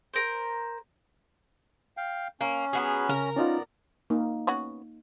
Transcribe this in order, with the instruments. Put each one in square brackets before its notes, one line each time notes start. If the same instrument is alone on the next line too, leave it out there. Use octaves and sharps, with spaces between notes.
[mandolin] A#4 C5
[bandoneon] F5 G5
[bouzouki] A#3 [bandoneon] C#4
[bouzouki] F#3 B3 G#4
[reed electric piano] C#3 [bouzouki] A#4
[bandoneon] B3 D5 [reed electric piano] C#4 D#4 F4
[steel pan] A#3 D#4
[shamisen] B3 C#4 F#4